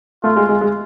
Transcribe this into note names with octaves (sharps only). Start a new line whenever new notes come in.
A3 F4
G#3
G#3
G#3